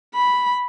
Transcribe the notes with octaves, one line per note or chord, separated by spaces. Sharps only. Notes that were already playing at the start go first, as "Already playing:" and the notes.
B5